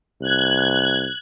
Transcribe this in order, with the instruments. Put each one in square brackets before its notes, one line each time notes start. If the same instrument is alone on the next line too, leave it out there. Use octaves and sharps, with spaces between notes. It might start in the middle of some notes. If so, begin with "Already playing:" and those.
[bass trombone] C2 [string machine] F#6 G#6